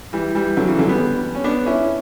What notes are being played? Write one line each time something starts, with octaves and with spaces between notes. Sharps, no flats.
E3 G3
E3 G3
D3 F#3
C#3 E3
D3 F#3
G3 B3
C#4
B3 D4
C#4 E4